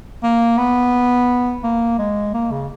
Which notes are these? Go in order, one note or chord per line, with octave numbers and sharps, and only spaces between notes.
A#3
B3
A#3
G#3
A#3
C#3